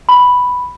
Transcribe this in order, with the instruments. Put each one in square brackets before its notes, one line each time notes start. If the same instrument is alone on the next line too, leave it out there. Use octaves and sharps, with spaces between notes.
[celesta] B5